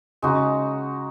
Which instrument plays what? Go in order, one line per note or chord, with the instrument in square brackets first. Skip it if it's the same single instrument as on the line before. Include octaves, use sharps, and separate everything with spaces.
[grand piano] C#3 [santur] G#3 D#4 F#4